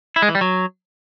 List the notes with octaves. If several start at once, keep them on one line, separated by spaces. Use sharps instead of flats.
E4
G#3
E3
G3
F#3